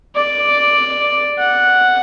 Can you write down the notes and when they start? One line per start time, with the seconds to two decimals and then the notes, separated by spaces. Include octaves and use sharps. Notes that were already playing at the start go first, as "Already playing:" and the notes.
0.15 D5
1.39 F#5